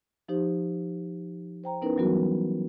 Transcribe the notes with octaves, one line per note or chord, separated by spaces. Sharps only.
F3 D#4 G4 C5
C5 G5 A#5
B3 C#4 D#4 E4 A#4 B4
E3 F#3 G3 B3 F#4 A#4